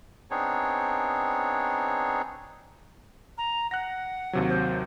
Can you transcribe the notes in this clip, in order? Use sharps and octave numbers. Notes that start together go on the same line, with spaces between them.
B3 C4 D4 D#4 G#4 C#5
A#5
F#5 F#6 A#6
D#2 C3 F#3
C5